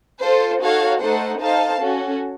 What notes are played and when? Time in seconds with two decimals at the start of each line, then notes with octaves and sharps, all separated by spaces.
0.20 F4 A4 C5
0.60 D#4 F#4 A4 C#5 F5
1.01 A3 D#4 A4 C5 F#5
1.40 D#4 A4 C5 F5 A5
1.80 C#4 F#4 A4